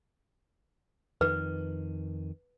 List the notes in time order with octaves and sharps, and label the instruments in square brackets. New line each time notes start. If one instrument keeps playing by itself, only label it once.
[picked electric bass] F2 D#3 [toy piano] B4